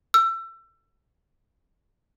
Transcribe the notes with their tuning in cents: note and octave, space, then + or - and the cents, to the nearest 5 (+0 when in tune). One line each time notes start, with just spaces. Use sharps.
E6 +30